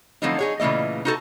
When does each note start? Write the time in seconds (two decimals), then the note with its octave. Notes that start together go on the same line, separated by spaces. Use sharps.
0.22 D3 F3 F#3 A3 C4 D#4
0.39 D#4 G#4 C#5
0.60 A#2 C#3 E3 A3 D#5
1.05 D#4 F#4 A4 A5